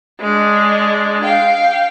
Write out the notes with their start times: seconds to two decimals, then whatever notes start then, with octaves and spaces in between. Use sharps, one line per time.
0.21 G#3 D4
1.24 F5 G5